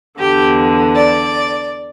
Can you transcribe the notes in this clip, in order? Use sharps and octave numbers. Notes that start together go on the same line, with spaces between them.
E2 D3 G4
D5